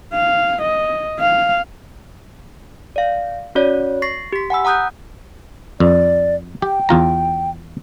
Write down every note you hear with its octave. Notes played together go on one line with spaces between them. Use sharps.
F5
D#5
F5
D5 F5
C#4 F#4 C#5 D5
C#6 A6 A#6 C7
G4 B6
F#5 G#5 B5 E6
F#5 A#5 D#6 F#6 G6
F2 D5
G4 G5
E2 F4 A#5